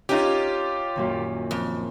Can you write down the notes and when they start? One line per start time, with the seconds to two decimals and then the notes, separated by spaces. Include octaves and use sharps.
0.09 C#4 D#4 F4 G4
0.96 F#2 A#2 D#3
1.51 F2